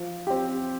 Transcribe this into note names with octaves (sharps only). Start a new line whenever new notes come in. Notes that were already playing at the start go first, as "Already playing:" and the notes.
Already playing: F3
C4 G4